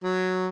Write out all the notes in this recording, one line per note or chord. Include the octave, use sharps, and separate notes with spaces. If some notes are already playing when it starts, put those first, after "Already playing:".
F#3